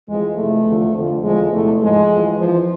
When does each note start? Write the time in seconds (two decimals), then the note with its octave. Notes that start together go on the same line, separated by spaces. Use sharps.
0.09 F2 E3 G#3
0.37 F2 C3 E3 A3
0.66 E2 D3 F3
0.95 F2 D3 F3
1.24 E2 D3 F3 G#3
1.52 E2 C3 E3 A3
1.81 G#2 F3 G#3
2.09 F2
2.15 E3
2.39 F2 E3 F3